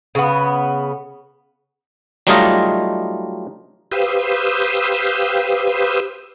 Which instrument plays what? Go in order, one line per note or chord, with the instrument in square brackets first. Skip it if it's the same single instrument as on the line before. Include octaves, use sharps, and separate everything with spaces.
[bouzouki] C#3 B3
[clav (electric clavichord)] F#3 G3 A3 D#4 F4 D#5
[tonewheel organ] G4 B4 C5 F5 D#6 E6